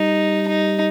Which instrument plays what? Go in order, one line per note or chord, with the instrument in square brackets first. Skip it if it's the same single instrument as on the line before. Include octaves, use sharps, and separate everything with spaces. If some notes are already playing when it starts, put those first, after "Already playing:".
Already playing: [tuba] G3 [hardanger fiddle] D#4
[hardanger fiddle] D#4